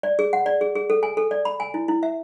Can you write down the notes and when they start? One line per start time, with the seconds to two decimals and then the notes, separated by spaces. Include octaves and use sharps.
0.03 D5
0.19 G#4
0.33 F#5
0.46 D5
0.61 G#4
0.75 G#4
0.90 A4
1.03 G#5
1.17 A4
1.31 D5
1.45 B5
1.60 G#5
1.74 E4
1.88 E4
2.03 E5